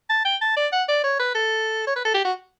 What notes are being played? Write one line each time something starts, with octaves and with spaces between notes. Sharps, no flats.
A5
G5
A5
D5
F#5
D5
C#5
B4
A4
C#5
B4
A4
G4
F#4